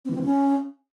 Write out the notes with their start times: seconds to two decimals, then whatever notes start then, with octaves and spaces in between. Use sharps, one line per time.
0.05 C4
0.10 E3
0.15 C4
0.20 E3
0.26 C#4